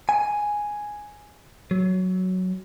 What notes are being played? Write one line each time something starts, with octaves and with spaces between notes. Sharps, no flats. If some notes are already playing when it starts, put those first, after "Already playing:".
G#5
F#3